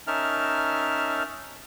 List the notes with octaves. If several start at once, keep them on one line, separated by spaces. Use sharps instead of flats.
C#4 D#4 A#4 E5 A5 F6